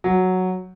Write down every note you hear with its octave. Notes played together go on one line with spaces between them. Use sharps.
F#3